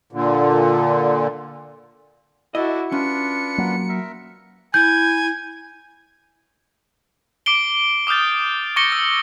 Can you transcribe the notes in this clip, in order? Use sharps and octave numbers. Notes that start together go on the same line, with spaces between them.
A#2 D3
E4 F#4 A4 D5 D#5
C#4 D4 F4 B4 C#7
F#3 A#3
A#4 E5
E4 G#5 G6
D6 C7 D7 G7
D6 D#6 F6 G6 A6
C#6 D6 A6 A#6 C#7 G7
E6